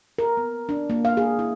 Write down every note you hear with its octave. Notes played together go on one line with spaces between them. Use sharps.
A#4
B3
D4
A#3
F5
G#4
E4